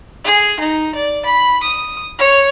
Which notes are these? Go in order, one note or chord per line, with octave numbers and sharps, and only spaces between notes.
G#4
D#4
D5
B5
D#6
C#5